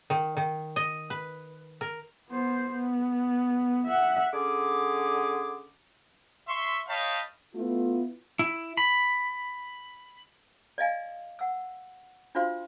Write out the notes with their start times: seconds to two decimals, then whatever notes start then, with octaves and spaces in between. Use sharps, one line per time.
0.10 D#3
0.37 D#3
0.76 D#5
1.10 B4
1.81 A#4
2.29 B3 C5
2.72 B3
3.86 E5 F#5
4.33 D3 C#4 G#4 D6
6.48 E5 C6 C#6
6.88 C#5 D#5 F5 G5 A5 B5
7.55 A3 B3 E4 F4
8.39 E4
8.77 B5
10.78 D5 D#5 F5 G#5
11.39 F#5 E6
12.35 D4 F4 F#4 C5 F5 C6